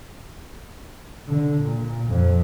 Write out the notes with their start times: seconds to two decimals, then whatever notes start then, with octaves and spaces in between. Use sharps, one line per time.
1.27 D3
1.62 A#2
2.09 F2